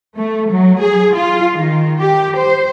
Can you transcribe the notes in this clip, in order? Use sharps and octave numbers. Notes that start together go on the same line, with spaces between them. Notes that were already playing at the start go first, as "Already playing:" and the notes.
A3
F#3
G#4
F4
D#3
G4
C5